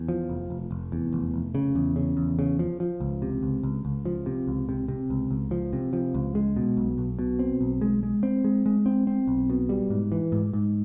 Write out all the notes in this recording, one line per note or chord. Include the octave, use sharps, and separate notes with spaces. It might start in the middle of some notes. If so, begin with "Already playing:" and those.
Already playing: E2
F3
F1
F1
F1
E2
F1
F1
C#3
E2
C#3
E2
C#3
F3
F3
C#2
C3
C#2
C#2
C#2
F3
C3
C#2
C3
C3
C#2
C#2
F3
C3
F3
C#2
G#3
B2
B1
B1
B2
C4
B1
G#3
G#3
C4
G#3
G#3
C4
C4
B1
B2
G3
G#2
E3
G#2
G#2